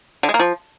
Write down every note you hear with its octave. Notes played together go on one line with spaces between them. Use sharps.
D3
G#3
A#3
F3